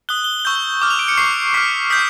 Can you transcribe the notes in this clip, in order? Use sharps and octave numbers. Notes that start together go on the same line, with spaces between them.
D#6 F#6 G7
G7
G7
C#6 E6 G6
G7
D6 F6
F7
D7
C#7
C#6 F6 C7
C#6 F6 B6
D#6 G6 B6